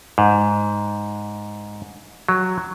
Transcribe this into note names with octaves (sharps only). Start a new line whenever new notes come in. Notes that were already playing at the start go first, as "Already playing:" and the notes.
G#2
F#3